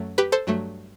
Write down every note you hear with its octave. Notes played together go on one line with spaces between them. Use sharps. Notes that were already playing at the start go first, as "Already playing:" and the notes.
Already playing: F#2 F#3 A3
G4 B4
A4 C5
G2 F#3 A3